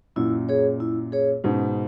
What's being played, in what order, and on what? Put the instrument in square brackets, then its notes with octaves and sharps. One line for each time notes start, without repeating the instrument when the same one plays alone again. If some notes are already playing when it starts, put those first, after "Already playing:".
[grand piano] F#2 A#2 [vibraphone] E4
[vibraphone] G#4 C#5
E4
G#4 C#5
[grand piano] G#2 B2 [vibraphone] C#4